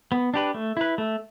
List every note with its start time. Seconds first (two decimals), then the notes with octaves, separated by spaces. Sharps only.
0.12 B3
0.34 D4 G4 B4
0.54 A3
0.77 E4 B4
0.98 A3